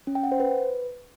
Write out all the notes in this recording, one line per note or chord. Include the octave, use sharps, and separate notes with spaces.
C#4
G5
F#5
C5
B4